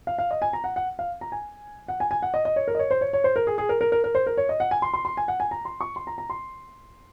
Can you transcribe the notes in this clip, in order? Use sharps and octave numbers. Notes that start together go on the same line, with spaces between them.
F5
F5
D#5
G#5
A#5
F#5
F#5
F5
A#5
G#5
F#5
G#5
G#5
F#5
D#5
D#5
C#5
A#4
D#5
C#5
C5
C#5
C#5
C5
A#4
G#4
G#4
A#4
A#4
A#4
A#4
C5
A#4
C#5
D#5
F#5
G#5
C6
C6
C6
G#5
F#5
G#5
A#5
C6
C#6
C6
A#5
A#5
C6